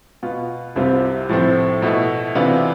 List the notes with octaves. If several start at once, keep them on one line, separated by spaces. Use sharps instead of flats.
B2 B3 F4
C2 C3 G3 C4 F4
A2 F3 A3 C4
B2 A3 E4
C3 E3 B3 D4 F4